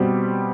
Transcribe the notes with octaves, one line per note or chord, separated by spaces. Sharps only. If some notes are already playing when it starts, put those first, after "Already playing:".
Already playing: B2 G3 C4 G4 C5